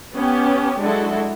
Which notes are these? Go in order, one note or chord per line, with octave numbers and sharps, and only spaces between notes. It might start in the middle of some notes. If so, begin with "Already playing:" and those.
B3 C#4 G4
F#3 G#3 D4 E4 F#4 A4